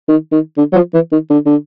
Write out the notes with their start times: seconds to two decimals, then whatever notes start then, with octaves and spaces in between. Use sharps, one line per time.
0.09 D#3
0.32 D#3
0.58 D3
0.72 F#3
0.75 F3
0.94 E3
1.12 D#3
1.30 D3
1.46 D3